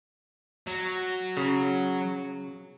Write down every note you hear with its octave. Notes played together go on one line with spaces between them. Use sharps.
F#3
C#3